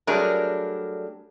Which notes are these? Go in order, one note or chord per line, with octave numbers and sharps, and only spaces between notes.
F#3 G3 A3 D4 G#4 A#4